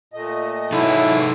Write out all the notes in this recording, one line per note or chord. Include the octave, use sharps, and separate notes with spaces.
A#2 A3 D#5
G#2 E3 F#3 D#4 E4 A4